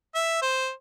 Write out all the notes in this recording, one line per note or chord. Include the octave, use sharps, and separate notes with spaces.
E5
C5